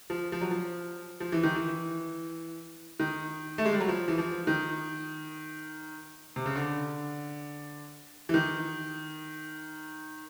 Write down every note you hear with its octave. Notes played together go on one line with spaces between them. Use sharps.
F3
F3
F#3
F3
F3
E3
D#3
E3
D#3
A3
G#3
G3
F#3
F3
E3
F3
D#3
C3
C#3
D3
E3
D#3